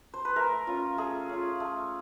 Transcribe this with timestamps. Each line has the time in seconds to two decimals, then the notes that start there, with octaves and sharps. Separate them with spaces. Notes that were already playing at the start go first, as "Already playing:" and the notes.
0.14 C5
0.25 B4
0.36 A3 A#4
0.67 C#4 F4
0.98 A3 G#4
1.29 C#4 F4
1.60 A3